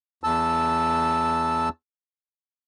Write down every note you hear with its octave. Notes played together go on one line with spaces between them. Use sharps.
E2 A5 E6